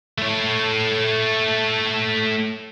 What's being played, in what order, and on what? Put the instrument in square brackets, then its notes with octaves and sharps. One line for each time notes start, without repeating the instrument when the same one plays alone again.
[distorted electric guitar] A3 C#5